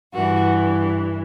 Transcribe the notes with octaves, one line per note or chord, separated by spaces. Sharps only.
G2 E3 F#4